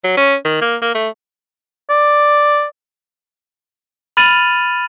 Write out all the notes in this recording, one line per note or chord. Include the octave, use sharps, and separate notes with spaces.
F#3
C#4
D#3
A#3
A#3
A3
D5
B5 F6 A6 D#7 F7 F#7